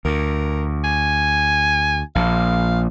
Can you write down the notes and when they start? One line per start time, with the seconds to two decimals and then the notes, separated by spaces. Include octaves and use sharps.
0.05 D2 A#4
0.84 G#5
2.15 A#1 A#2 F5